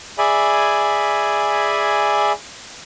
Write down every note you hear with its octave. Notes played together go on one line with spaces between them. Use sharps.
G#4 D5 E5 G#5 B5